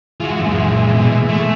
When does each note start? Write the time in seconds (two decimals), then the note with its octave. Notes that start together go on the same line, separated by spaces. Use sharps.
0.20 E3 G#3 F4 F#4
0.40 F#2 A#2
0.94 B2
1.29 A3